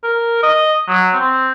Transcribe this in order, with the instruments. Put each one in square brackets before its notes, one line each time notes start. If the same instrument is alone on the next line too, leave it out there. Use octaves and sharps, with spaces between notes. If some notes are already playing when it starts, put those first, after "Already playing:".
[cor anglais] A#4
D#5
F#3
C4